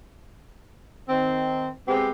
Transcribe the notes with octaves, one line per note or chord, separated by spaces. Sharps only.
D#3 C4
G#3 B3 C4 G4